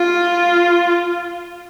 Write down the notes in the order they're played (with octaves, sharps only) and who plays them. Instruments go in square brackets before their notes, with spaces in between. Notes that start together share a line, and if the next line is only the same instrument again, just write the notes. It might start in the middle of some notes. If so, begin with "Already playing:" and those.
Already playing: [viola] F4